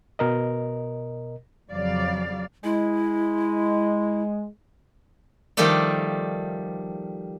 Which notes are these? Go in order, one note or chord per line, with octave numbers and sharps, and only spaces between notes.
B2 A#4 D#5
F2 C#3 F#3 D5 F5
G#3 E4
D#3 F3 G3 A3 A4 D5